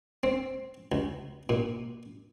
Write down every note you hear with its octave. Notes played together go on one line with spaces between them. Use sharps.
C4
C#2
A#2